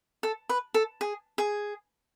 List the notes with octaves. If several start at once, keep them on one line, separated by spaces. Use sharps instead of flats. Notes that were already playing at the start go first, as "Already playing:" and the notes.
A4
B4
A4
G#4
G#4